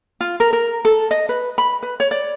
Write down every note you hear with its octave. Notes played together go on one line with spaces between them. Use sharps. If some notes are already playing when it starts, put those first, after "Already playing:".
F4
A#4
A#4
A4
D#5
B4
B5
B4
C#5
D5